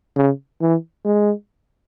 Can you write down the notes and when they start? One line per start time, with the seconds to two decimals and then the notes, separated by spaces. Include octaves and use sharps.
0.16 C#3
0.61 E3
1.05 G#3